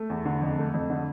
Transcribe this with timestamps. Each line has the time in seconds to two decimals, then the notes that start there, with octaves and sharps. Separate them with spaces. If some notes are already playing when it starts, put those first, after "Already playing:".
Already playing: A3
0.10 E2
0.25 D3
0.42 F2
0.58 A3
0.74 F2
0.90 D3